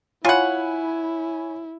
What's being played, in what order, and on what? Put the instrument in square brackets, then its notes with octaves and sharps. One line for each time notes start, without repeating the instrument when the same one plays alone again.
[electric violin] E4 [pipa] F4 F#5 [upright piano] C#5 G#5 B5